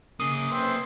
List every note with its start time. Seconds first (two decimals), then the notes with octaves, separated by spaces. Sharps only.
0.20 C#3 A#3 G#4 D6 D#6
0.51 C4 C#4 E4 B4 C5